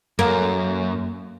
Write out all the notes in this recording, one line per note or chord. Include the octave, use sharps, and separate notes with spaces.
F#2 A#3